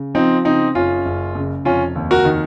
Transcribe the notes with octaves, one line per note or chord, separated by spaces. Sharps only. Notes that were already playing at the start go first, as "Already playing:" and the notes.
Already playing: C#3
F3 C4 D#4
C#3 C4 D#4
F#1 C#4 F4
F#1
C#3
F1 C#4 F4
D#2
F#4 A#4
D#3